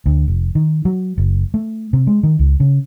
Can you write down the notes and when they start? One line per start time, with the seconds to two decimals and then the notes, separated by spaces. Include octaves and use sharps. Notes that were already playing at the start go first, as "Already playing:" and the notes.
0.06 D2
0.28 F1
0.55 D#3
0.85 F#3
1.18 F#1
1.54 A3
1.93 C3
2.07 G#3
2.23 D#3
2.39 C#2
2.60 C#3